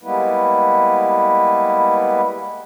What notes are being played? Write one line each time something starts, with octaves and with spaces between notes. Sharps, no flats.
G3 G#3 A#3 B3 E4 B4